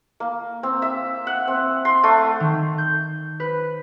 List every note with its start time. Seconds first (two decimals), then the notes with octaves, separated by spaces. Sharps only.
0.20 A#3
0.63 C4
0.82 E5
1.27 F#5
1.48 C4
1.85 C6
2.04 A3
2.40 D#3
2.78 G6
3.40 B4